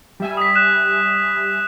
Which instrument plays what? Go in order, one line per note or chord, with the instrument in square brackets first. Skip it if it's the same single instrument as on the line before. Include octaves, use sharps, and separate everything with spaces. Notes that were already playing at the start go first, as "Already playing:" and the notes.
[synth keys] G3 E5 G#5
[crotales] D#6 B6
F#6 E7